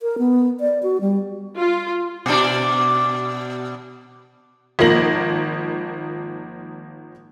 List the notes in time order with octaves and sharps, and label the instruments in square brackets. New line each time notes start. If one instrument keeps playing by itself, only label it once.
[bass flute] A#4
B3
D5
F#4
G3
[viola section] F4
[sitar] B2 D4
[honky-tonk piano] G#1 F3 A#3 A#6 F#7